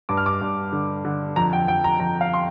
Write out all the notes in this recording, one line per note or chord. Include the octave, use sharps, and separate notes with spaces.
G2 D6
F6
D6
G2
D3
D3
F2 A#5
G5
F2 G5
A#5
F2 A#5
F5
C6